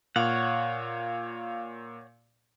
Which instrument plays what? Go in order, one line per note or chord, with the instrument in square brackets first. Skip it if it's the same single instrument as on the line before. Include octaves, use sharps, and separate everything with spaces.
[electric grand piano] A#2 [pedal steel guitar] C#5 F#5 [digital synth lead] F5